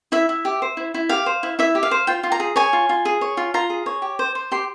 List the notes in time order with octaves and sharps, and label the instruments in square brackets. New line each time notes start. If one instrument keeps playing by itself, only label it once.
[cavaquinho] E4 E5
E4
G4
C5
E4
E4
G4 F5
C5
E4
E4 E5
G4
F5
C5
F4 G5
F4
A#5
G#4
C#5 G#5
F4
F4
G#4
C#5
F4
F4 A#5
G#4
C#5
G4
C5
C5
G4 C6